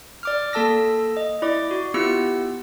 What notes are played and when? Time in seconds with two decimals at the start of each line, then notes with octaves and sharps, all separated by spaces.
0.23 D5 D6 F6
0.53 A#3 A4 A5 E6 A#6
1.17 D#5
1.42 E4 D5 D6
1.71 F#4
1.94 B3 E4 F4 G4 E6 C#7